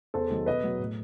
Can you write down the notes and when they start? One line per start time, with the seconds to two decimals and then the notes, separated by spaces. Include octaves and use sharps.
0.14 E2 A4 C5
0.30 D#3 F#3
0.46 B2 B4 D#5
0.64 F#3
0.79 A2